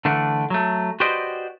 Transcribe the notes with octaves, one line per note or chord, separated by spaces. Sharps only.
D3 E3 A3 D4
F#3 A3
F#4 G4 B4 C5 D5 D#5